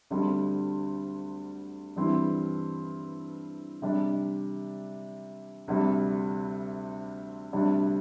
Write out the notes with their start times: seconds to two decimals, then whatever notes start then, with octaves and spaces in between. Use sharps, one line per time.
0.10 D2 D3 G3 C4
1.96 G2 E3 G3 C4 E4
3.82 C3 G3 D4
5.68 D2 C3 G3
7.53 D2 C3 G3 D4